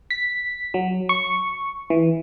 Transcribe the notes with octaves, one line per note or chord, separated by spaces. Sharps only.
B6
F#3
C#6
E3